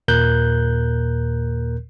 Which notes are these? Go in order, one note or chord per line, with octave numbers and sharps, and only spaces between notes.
D#2 A#2 A#4 F#6 G6